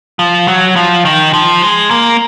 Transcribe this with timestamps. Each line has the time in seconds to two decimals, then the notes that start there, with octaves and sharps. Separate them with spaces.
0.19 F3
0.48 F#3
0.76 F3
1.05 D#3
1.33 F3
1.62 G#3
1.91 A#3